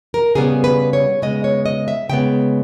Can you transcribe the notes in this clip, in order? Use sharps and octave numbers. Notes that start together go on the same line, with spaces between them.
A#4
C#3 G3 B3 G#4
B4
C#5
C#3 G#3 B3 D#5
C#5
D#5
E5
C#3 G#3 B3 G5